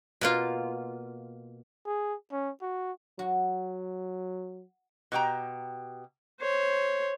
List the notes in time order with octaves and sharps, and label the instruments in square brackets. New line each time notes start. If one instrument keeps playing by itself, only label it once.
[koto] B2 A#3 F4
[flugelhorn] G#4
C#4
F#4
[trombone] F#3 [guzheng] F#4
[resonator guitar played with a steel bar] B2 G4 G5 A#5
[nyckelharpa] C5 C#5